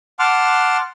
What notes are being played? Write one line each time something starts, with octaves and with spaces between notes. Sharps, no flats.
F#5 A5 C6 D6 F6